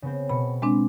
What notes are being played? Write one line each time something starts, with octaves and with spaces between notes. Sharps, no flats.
C#3 B3 C4
B2 B5 C#7
G#3 C4 D4